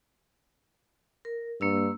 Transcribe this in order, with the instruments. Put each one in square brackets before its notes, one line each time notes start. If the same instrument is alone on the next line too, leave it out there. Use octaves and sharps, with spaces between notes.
[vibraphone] A#4
[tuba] G2 [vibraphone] A#3 D4 E6